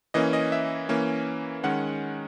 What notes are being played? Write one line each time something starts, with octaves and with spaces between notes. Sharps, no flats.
E3 A#3 C#4 D#5
D#5
E5
E3 A#3 C#4
D#3 G#3 C#4 F#5